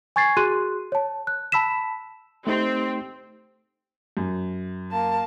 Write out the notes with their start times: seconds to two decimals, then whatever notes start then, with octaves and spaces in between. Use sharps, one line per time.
0.16 G#5 C#6 G#6 A6 C7
0.37 F#4 G#4 C6 F#6 D#7
0.92 C#5 A5
1.27 F#6
1.52 A5 B5 E6 B6 E7
2.47 A3 C4 D#4 G4
4.17 F#2
4.92 A#3 A5